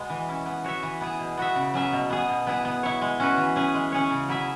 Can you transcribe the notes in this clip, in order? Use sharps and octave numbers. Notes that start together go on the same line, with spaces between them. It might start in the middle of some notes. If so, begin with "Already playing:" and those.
Already playing: B2 G#3 B3 G#4
E3
C#4 E4
B3
F#4 C#5 E5
E3
B3 E4 G#4
B2
B3 F#4 E5
C#3
F#3 C#4 G#4 E5
B2
B3 G#4
B2
B3 E4 G#4
B3
E4 C#5
G#3
C#4 F#4 B4
E3
C#4 G#4 B4
G#3
C#4 G#4 C#5
C#3
F#3 E4 G#4 E5